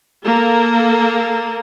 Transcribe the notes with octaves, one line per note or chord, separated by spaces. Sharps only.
A#3 A4